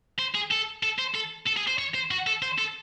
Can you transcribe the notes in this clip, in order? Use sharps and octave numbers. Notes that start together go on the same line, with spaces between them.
C5
G#4
A4
A4
C5
A4
A4
G#4
C5
C#5
C5
F#4
A4
C5
A4